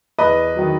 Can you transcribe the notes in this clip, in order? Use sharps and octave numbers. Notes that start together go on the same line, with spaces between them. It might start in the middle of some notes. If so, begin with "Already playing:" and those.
E2 B4 D#5
D#3 F#3